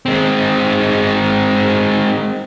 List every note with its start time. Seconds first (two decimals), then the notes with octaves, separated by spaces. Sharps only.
0.06 G#3 C4